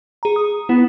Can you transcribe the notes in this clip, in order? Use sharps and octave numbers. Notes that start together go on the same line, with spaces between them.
G#4 A#5
D#6
B3 E4